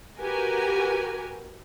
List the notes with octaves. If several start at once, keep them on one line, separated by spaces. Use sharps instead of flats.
F#4 G4 A#4 B4 G#5